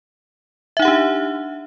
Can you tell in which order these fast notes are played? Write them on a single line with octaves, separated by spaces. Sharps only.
E5 D#4 F#5 G4 D4